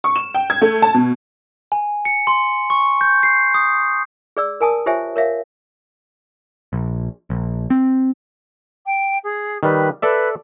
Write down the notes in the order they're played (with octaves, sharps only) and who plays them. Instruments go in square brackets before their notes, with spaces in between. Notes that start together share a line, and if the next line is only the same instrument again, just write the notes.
[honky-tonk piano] C#6
E7
G5
G#6
A3
A5
B2
[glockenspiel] G#5
C#7
C6
C#6
G6
C7
D#6
[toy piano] G#4 D5 E6
A#4 G#5 A5 D#6
F4 G4 C5 C#5 E5 G#5
A#4 C#5 E5 F5
[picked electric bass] A#1
A#1
C4
[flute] G5
G#4
[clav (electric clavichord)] D#3 G3 [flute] B4
[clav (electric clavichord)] A4 D5 E5 [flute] B4